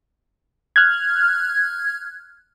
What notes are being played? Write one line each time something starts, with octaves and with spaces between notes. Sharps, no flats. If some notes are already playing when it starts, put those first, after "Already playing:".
F6 F#6 G#6